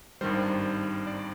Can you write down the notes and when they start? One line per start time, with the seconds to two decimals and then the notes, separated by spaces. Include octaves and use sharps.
0.21 G#1 G2 D#3 G3 C5
1.07 D5